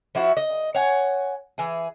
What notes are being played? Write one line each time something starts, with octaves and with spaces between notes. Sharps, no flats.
F3 E4 F#4
D#5
C#5 F#5 G#5
E3 G#4